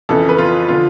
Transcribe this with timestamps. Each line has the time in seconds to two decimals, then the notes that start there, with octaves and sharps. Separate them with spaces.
0.09 F2 C#3 E3 A4
0.29 B4
0.38 F4
0.68 D3 F3 F4